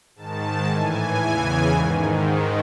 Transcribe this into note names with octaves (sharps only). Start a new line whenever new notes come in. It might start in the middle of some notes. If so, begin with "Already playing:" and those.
G#2 D#3 A5
A2 E3 G#5
E2 C#3 E3
G#2 D#3